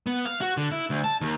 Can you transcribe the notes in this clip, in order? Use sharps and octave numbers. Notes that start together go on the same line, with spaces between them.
B3
F5
F#4
D3
E4
D2
A5
D#2